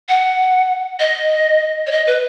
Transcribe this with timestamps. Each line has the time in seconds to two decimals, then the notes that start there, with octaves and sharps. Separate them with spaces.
0.09 F#5
1.00 D#5
1.87 C#5
1.91 D#5
2.07 B4